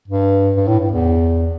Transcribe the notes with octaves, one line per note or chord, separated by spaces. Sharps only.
G2
G2
A2
G2
E2